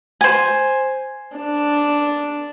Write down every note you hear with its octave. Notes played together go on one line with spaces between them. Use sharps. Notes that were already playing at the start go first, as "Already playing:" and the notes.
C5 G#5
D4